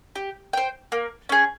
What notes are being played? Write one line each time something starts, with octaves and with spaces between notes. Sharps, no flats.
G4
C5 G5
A#3
C#4 G#4